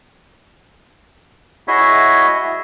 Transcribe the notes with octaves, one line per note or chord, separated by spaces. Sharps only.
E4 F#4 G#4 C#5 D#5 E5